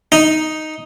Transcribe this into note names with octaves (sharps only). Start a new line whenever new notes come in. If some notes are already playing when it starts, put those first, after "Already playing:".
D#4